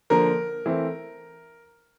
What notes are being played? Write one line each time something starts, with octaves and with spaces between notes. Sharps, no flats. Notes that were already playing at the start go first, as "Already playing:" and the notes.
D3 F3 A#3 A#4
E3 A3 C4